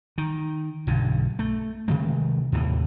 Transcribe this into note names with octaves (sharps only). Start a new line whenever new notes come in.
D#3
B1 G2 D3
A3
C3 D#3 G#3 A3
D#2 A2 C3 E3